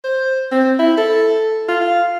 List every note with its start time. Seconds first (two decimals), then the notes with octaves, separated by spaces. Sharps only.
0.04 C5
0.52 C4
0.79 E4
0.97 A4
1.68 F4
1.81 F5